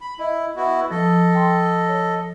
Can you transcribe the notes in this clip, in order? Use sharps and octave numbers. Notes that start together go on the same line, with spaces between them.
B5
E4 D#5
B3 E4 F#4
F3 A4 D#5
G5 C6
C#5